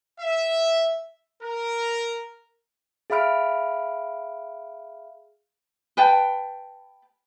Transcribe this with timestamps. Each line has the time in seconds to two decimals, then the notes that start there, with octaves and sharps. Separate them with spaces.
0.20 E5
1.43 A#4
3.10 G#4 E5 F5 B5 F6 D7
5.97 B4 G5 A5